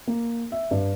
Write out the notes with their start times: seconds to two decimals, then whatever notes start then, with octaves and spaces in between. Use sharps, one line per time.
0.07 A#3
0.52 E5
0.71 G2